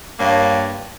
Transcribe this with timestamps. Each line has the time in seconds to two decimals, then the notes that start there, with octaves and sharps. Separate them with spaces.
0.19 G2 A#3 C#5